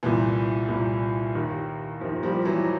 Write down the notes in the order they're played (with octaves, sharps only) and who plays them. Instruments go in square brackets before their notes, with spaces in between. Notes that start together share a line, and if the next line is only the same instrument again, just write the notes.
[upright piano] C2 A#2 E3
C2 A#2
D#2 D#3
D#2 D#3 F3
F3 G3
E3 F#3